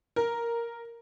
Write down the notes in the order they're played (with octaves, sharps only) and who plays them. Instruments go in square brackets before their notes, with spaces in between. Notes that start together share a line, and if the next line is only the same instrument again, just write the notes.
[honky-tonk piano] A#4